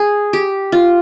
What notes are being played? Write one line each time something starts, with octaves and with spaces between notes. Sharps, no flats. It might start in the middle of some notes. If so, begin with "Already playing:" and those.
Already playing: G#4
G4
F4